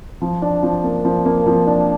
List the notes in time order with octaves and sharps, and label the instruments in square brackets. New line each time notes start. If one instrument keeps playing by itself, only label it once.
[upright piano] F3
D4
F3
A#3
F3
A#3
F3
D4